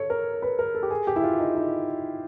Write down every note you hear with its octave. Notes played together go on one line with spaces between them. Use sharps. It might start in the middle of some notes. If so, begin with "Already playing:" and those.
Already playing: A4 C#5
A#4
B4
A#4
A4
G4
G#4
G4
E4
F4
D#4
D#4